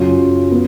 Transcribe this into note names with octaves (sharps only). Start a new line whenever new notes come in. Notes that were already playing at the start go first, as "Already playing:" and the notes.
Already playing: F#2 C#3 F#3 C#4 F4
B3